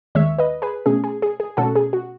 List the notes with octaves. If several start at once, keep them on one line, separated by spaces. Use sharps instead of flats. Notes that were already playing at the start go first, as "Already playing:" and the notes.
D#2 D#3 G#3 C#5 E5
B4 D#5
G#4 B4
B2 A3 C#4 G#4
G#4
G#4
G#4
B2 A3 C#4 F#4 A4
G#4
F#4